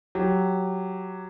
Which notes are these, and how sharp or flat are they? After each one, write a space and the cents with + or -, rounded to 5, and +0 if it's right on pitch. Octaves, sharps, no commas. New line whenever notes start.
F#3 +0 G4 -5